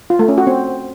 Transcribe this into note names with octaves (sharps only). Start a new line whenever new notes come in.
F4
A3
C#4
F#4
C4